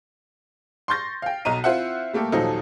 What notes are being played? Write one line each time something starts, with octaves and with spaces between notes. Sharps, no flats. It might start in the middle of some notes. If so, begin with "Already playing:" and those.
C6 C#6 G6 A6 A#6
F5 G5
B1 D#5 A#5 D#7
C4 E4 F4 C5 E5 F#5
G3 A3 A#3 G4 A4
D#1 F3 F#3 D#4 F4 A4